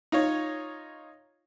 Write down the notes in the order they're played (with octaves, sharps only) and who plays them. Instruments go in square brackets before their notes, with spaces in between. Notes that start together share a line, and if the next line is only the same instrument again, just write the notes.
[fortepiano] D#4 F4 C#5